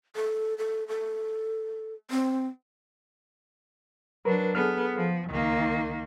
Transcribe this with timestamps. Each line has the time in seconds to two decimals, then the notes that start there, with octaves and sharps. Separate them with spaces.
0.16 A4
0.58 A4
0.88 A4
2.11 C4
4.25 F#3 D4 A#4 B4
4.55 B3 G#4 A4 F6
4.96 F3
5.31 C#2 D#3 A#3